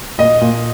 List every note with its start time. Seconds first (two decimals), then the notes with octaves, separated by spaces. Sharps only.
0.18 A#2 D#5
0.41 A#2